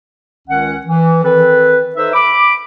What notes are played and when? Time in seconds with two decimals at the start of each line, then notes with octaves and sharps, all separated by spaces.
0.48 C#2 D#3 C#4 F#5
0.86 E3
1.24 D#3 C4 A4 B4
1.96 D#4 A4 B4 C5 E5
2.14 B5 D6